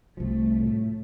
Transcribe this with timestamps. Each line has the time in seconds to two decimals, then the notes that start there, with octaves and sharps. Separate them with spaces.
0.17 C2 F3 A3
0.60 A2